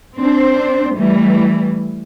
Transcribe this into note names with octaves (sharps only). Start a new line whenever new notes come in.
C4 D4 C5
E3 G3 A3